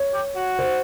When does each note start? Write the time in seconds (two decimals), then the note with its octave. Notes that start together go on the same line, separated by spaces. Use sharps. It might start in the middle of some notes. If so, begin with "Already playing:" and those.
Already playing: C#5
0.13 G4
0.35 F#4
0.59 C5